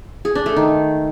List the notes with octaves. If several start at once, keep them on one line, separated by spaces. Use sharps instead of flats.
G#4
D4
A3
D#3